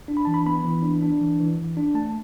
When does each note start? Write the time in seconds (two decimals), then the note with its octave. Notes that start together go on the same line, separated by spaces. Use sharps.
0.08 D4
0.17 B5
0.25 E3 A5
0.34 B5
0.46 B3 B5
0.65 E3
0.83 D4
1.02 D4
1.21 E3
1.40 E3
1.58 E3
1.77 D4
1.95 A3 A5